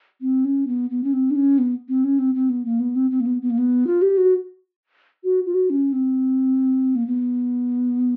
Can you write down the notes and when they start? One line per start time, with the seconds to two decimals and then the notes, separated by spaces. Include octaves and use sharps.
0.21 C4
0.45 C#4
0.67 B3
0.90 B3
1.04 C#4
1.13 C4
1.30 D4
1.36 C#4
1.58 B3
1.89 C4
2.04 C#4
2.19 C4
2.35 C4
2.49 B3
2.65 A#3
2.80 B3
2.95 C4
3.11 C4
3.20 A#3
3.26 B3
3.42 B3
3.50 A#3
3.58 B3
3.87 F4
4.02 G4
4.17 F#4
5.24 F#4
5.46 F4
5.54 F#4
5.70 C#4
5.93 C4
6.95 A#3
7.07 B3